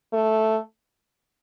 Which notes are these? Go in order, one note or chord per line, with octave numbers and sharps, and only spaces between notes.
A3